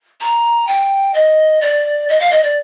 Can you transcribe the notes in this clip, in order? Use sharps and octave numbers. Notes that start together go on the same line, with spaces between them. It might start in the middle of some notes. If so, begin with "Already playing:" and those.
A#5
G5
D#5
D5
D#5
F5
D#5
D5